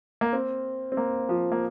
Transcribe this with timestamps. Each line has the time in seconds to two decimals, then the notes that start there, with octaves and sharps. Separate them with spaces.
0.21 A#3
0.33 C4
0.92 C4
0.97 A#3
1.29 F3
1.52 A#3